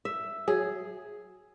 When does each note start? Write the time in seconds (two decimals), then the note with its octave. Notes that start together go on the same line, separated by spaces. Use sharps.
0.05 E5
0.48 F#3 G#4